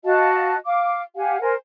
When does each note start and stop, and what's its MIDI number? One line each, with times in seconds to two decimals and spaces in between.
0.05 0.56 66
0.05 0.56 75
0.05 0.56 77
0.05 0.56 81
0.66 1.03 77
0.66 1.03 86
1.16 1.40 67
1.16 1.40 77
1.16 1.40 78
1.16 1.40 80
1.41 1.54 70
1.41 1.54 72
1.41 1.54 80